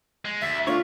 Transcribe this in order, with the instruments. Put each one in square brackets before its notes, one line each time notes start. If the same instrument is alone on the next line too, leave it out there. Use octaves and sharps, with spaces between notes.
[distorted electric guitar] G#3
[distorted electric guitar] D2 [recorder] E5
[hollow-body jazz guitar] A3 D4 C#5 [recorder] F4